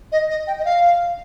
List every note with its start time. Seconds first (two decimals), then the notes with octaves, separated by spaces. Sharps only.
0.12 D#5
0.30 D#5
0.47 G5
0.59 D#5
0.65 F5